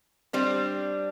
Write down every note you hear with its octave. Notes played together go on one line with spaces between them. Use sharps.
G3 C4 D4